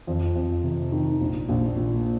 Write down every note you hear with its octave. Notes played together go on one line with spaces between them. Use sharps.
F2
F2
C3
D#3
A#1
A#1
A#2